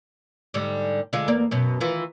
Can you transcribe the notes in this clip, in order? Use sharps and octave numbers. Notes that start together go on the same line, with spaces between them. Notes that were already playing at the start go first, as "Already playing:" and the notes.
G#2 D3 G3
D3 G#3 F4
E2 A#3 D5
F#2 B2
D#3 E3 F4